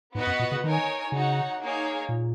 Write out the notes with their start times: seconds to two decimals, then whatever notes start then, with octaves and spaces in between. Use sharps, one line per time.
0.15 G#2 B3 F#4 B4 D#5 F#5
0.27 F#2
0.39 A#2
0.52 C#3
0.63 D#3 D#4 A#4 C#5 G#5
1.12 C#3 D#4 F#4 C#5 F#5
1.61 A#3 D#4 G#4 C#5 F5
2.09 A#2